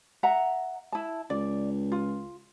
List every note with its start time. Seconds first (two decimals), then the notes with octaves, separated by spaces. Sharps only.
0.23 E5 F#5 A#5
0.92 E4 A5
1.30 C#2 D5
1.92 F4